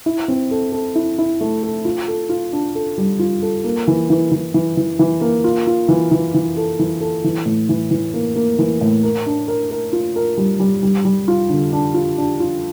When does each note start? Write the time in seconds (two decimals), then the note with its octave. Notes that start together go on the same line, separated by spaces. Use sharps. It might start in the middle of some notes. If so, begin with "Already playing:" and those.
0.06 E4
0.28 C4
0.51 A4
0.72 A4
0.95 E4
1.18 E4
1.41 A3
1.63 A4
1.85 F4
2.08 A4
2.29 F4
2.52 D4
2.75 A4
2.98 G3
3.19 F4
3.42 A4
3.64 A#3
3.88 E3
4.10 E3
4.32 E3
4.54 E3
4.77 E3
4.99 E3
5.21 A#3
5.44 F4
5.67 F4
5.88 E3
6.11 E3
6.34 E3
6.57 A4
6.79 E3
7.01 A4
7.24 E3
7.46 A2
7.69 E3
7.91 E3
8.14 A#3
8.36 A#3
8.59 E3
8.81 A2
9.03 A#4
9.26 D4
9.48 A#4
9.71 A#4
9.93 F4
10.16 A#4
10.37 G3
10.60 G3
10.83 G3
11.05 G3
11.28 F4
11.49 D3
11.72 D4
11.94 F4
12.18 D4
12.40 F4